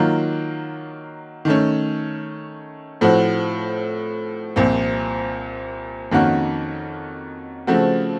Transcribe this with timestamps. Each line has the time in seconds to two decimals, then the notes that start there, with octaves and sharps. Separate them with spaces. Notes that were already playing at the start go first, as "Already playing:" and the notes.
Already playing: D#3 F#3 A#3 F4
1.45 D#3 A3 C#4
3.01 A2 F3 C4 F#4
4.56 C2 A#2 F3 C4
6.12 F2 D#3 A#3 C#4 F#4
7.67 C#3 F3 A3 C4 F#4